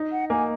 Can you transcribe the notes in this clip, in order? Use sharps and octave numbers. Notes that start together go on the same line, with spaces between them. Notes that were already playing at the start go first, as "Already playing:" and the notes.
Already playing: D#4
F#5
A#3 G#5